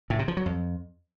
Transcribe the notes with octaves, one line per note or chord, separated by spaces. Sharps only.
A2
C3
F3
F#3
F2